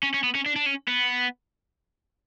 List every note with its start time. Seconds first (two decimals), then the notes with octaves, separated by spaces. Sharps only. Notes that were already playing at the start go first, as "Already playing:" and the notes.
0.03 C#4
0.14 C#4
0.23 B3
0.35 C#4
0.46 D4
0.56 D4
0.66 C#4
0.88 B3